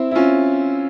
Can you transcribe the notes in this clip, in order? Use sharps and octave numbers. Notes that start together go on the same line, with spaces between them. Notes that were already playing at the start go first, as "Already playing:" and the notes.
Already playing: C4 E4
E4
C#4 F4